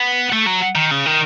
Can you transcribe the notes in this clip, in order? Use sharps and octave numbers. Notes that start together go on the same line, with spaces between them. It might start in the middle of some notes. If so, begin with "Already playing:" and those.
Already playing: B3
A3
F#3
D#3
C#3
D#3